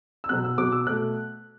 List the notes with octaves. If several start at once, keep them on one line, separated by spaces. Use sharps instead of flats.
E6
B2 F#3 B3 F#6
E6
B2 F#3 B3 D6
E6
B2 A3 F#6